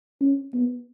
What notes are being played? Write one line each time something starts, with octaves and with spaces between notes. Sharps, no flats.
C#4
B3